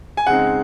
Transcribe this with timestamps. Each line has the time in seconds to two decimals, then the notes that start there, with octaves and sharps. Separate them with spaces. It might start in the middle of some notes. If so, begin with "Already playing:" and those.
0.17 G#5
0.27 C#3 G#3 C4 D#4 F#5